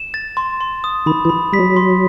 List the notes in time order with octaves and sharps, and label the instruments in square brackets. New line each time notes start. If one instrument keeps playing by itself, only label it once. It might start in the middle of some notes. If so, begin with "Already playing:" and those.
Already playing: [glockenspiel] E7
A6
C6
C6
D#6
[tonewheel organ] D#3 [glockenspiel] B5
[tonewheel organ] E3
[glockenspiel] B5
[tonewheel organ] G3 [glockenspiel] B6
[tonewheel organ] F#3
[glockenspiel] C6